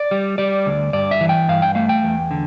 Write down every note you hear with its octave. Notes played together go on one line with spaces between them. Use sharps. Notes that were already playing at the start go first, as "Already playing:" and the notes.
Already playing: D5
G3
G3 D5
D2
G2 D5
E5
E3
G5
G2 F5
G5
A3 F5
G5
E2
D3